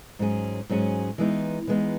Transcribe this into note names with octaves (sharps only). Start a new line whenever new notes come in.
G#2 F#3 C#4 G#4
G#2 F#3 C#4 G#4
E3 G#3 B3 D#4
E3 G#3 B3 D#4